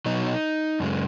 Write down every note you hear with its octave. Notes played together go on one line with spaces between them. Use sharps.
B2 F#3 D#4
F#2 C#3 G#3